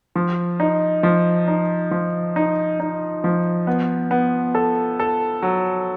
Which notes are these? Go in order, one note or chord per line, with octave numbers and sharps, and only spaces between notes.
F3
D#4
F3
D#4
F3
D#4
D#4
F3
B3
B3
A4
A4
F#3